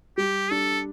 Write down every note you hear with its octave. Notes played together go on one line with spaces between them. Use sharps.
G3 G4
D4 A4